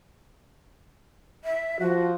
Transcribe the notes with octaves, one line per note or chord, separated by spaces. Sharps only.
E5
F3 F#4